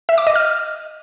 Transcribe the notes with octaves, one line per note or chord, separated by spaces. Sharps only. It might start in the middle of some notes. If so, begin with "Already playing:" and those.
E5
D6
D#5
F6